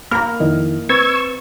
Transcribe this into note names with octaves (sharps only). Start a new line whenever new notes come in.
A#3 A#5 B5 F6
F2 D#3 E4 D#5
C4 B4 C#6 E6 G#6 A6